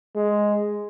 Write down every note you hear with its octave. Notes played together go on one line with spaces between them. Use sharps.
G#3